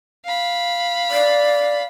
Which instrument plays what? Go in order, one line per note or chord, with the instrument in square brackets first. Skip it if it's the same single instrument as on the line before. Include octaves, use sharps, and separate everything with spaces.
[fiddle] F5 B5
[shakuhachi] D5